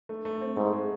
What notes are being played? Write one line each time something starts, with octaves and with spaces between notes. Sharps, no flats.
A3
A3
C4
G#2 A3
G#3